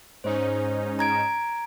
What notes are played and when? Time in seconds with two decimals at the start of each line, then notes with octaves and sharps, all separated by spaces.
0.24 G#2 C#4 D#4 C5
0.99 A#5 G#6 D7